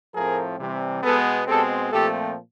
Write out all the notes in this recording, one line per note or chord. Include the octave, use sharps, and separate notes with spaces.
A2 F3 A3 C4 G#4 A#4
C3 E3 G3
B2 G#3 B3 A4 B4
B2 G#3 C4 G4 A4
A#2 F3 A3 C4 G4 A4